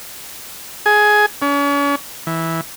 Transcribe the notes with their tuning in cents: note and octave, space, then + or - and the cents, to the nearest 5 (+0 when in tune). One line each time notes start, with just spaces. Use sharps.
G#4 +15
C#4 +40
E3 -10